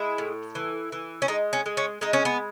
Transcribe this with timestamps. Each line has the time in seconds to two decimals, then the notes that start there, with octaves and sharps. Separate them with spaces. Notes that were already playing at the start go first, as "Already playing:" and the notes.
Already playing: G#3 E4
0.18 A2
0.55 E3
0.92 E3
1.22 C#4
1.28 G#3 D#4
1.53 C#4
1.66 G#3
1.77 C#4
2.01 G#3 D#4
2.13 C#4
2.25 B3